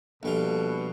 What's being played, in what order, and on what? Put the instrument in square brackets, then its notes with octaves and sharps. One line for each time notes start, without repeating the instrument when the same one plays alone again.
[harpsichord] A#1 G3 F4 [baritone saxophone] B2 [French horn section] A4